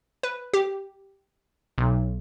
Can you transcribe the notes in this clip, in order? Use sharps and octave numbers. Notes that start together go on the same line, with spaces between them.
B4
G4
B1